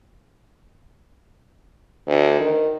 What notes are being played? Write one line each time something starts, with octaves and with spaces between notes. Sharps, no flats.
D2
D#3